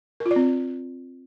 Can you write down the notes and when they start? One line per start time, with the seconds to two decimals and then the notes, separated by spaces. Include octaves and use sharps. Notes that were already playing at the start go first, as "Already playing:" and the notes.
0.20 A#4
0.26 F4
0.31 D5
0.36 C4